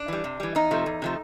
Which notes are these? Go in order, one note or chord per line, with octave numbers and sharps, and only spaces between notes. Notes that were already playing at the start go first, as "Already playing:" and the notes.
Already playing: D4
E3 G3
C3
E3 G3
E2 D#4
C3 F3 A3
E2
C3 F3 A3